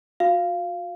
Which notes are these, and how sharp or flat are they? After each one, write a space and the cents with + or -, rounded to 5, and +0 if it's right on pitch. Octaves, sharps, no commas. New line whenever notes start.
F#4 -40 F5 -10